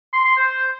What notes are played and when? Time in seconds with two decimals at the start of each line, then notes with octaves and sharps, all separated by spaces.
0.13 C6
0.25 C6
0.37 C5